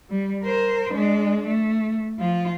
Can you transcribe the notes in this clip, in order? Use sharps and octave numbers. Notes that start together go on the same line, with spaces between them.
G3
A#4 C5
G#3 D4
A3
F3 F4